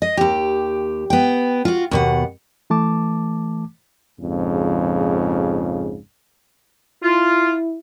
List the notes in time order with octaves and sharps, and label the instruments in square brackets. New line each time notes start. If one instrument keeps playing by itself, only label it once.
[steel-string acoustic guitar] D#5
D#2 G4
B3 G5
F4 F#4
D#2 B2 F#5
[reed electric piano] E3 A3 A5 D6
[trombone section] A#1 F2 G#2 C#3
[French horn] E4 [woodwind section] F4